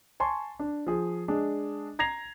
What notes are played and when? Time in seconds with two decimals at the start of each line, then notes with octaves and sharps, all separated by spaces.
0.20 G#5 A5 C6 C#6
0.59 D4
0.86 F3 G#4
1.28 G#3 D4 G#4
1.99 A#5 G#6 A#6 C7 F7